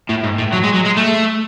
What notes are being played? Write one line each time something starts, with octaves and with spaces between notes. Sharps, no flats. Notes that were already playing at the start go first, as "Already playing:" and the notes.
A2
G#2
A2
F#3
G#3
F#3
G#3
A3